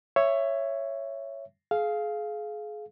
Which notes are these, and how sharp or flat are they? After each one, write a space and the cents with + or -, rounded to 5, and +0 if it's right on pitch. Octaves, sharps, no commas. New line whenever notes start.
C#5 +0 E5 +15
G#4 +30 F5 -5